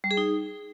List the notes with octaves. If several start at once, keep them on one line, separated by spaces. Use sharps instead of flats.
G3
G#4
D#4